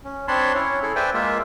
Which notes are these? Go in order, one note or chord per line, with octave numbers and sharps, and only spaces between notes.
C#4
C4 D4 C#5 A5 B5 C6
C#4 E4 C#5
E4 G#4 A4
B4 C5 D5 E5 G5 G#5
G#3 A#3 F4 E5